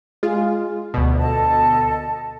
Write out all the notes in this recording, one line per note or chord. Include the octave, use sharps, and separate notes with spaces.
G#3 F4
D2 B2
A4 D#5 A5